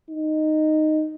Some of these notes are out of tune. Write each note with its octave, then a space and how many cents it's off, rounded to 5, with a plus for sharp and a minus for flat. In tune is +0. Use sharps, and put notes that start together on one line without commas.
D#4 -5